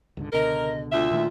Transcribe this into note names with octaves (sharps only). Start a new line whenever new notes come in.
C#2 G#2 D3
C#2 B2 D3 A#4 D#5
D2 F4 E5
A#2 D#3 A3